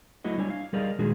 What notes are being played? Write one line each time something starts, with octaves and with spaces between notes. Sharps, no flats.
F#3 A3 E4 F#4 D#5
G3 D4 C#5 G#5
F5
G3 G#4 A#4 D5 D#5 F5
A#2 D#3 G#3 D4 F#4 G#4